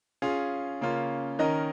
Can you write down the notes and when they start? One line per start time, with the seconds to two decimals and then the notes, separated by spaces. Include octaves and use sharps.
0.22 C#4 F4 G#4 F5
0.81 C#3 A#3 C#4 F4
1.39 D#3 C#4 A#4 D#5